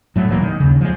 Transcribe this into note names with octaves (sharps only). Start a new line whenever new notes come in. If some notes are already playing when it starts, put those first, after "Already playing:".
A2 F#3 A3
D#1 E3 F#3 A#3
D#3
D#2 C#3
F3 G#3